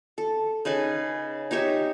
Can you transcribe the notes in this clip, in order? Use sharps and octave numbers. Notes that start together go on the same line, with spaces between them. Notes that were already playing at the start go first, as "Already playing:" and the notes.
A4
C#3 D#4 B4 G#5
D#4 G4 C#5 E5